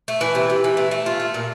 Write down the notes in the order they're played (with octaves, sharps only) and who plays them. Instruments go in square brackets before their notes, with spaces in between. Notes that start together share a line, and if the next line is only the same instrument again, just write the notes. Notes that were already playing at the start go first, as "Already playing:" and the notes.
[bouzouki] A3
E3
C3
C3
E3
A3
A3
F4
A3
A#2